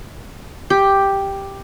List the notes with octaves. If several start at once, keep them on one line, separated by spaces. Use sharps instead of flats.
G4